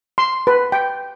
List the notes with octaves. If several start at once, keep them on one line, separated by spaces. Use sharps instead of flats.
C6
B4
G5